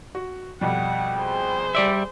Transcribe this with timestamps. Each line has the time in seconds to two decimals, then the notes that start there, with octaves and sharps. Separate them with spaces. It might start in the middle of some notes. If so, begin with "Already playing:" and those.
0.15 F#4
0.61 F2 B2 G3 F#5 G5
1.17 G#4 C5
1.75 G3 D5 E5